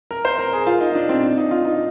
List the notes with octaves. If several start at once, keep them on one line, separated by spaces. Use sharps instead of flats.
A#4
C5
A#4
G#4
F4
D#4
D4
C4
D4
D#4
F4
D#4